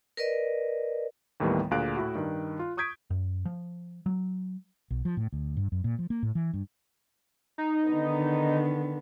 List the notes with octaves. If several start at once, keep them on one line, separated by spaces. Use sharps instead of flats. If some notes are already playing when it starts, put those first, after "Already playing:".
A#4 B4 D5 D#5
D#2 A2 D#3 E3 G3 B3
D2 A#2 G#4 F5 F#6 D7
A2 E4 F#4
G2 D#3
F4
C#6 D#6 G6 G#6 B6 D7
F#2
F3
F#3
B1
F3
A2
D2
G2
F#2
A#2
F3
A#3
A2
E3
G2
D#4
D3 D#3 B3